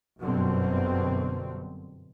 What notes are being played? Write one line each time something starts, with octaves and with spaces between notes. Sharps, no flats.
G1 F#2 B2 D3 C4